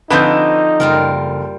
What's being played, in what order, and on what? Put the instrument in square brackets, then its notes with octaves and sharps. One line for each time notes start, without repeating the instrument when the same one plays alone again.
[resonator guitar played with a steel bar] D3 F3 C4 [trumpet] D#4 [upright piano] B4 G6
[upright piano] F#1 [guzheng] G3 F4 A#4